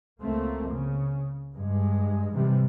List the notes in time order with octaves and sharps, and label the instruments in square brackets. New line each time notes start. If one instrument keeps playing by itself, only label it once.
[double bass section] C#2 A3 A#3 C4
C#3
G2 G#3
G#2 C3 E3 G3